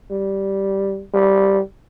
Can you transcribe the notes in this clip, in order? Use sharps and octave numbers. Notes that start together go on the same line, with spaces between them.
G3
G3